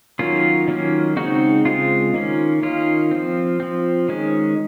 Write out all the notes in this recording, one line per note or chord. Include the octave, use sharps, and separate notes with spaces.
D#3 F#3 A#3 C#4 F4
D#3 F#3 A#3 C#4
C#3 G#3 C4 D#4 F#4
C#3 G#3 C4 F4
D#3 A#3 C#4
D#3 A#3 C#4 F4
F3 C4
F3 C4
D#3 G#3 C#4